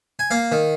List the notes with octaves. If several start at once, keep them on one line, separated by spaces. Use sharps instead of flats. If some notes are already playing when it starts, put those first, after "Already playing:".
G#5
A#3 F5
D#3